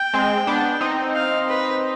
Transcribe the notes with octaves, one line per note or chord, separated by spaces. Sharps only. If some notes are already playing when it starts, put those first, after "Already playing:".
Already playing: G5
G#3 C4
B3 D4
C4 D#4
F5
B4